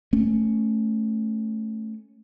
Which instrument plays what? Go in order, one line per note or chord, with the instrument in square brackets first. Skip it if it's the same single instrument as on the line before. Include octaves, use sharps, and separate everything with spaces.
[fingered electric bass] A3 C#4